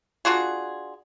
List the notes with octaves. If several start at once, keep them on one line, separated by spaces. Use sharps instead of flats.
D4 F4 F#4 G#4